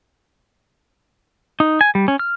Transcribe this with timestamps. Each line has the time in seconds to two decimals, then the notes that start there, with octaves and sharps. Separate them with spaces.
1.60 D#4
1.81 G#5
1.95 G3
2.08 C#4
2.19 F6